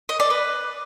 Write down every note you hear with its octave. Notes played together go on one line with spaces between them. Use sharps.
D#5
D5
B4